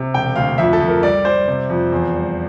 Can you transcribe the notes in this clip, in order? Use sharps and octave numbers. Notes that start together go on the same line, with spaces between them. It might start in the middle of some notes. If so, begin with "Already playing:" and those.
Already playing: C3
E1 G5
D2 F5
F2 E5
A4
F2
A#4
G3 D5
G3 C5
C3
F2
E2
G3